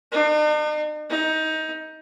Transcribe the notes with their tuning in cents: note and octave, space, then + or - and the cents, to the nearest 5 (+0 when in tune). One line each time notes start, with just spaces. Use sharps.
D#4 -45
D#4 +20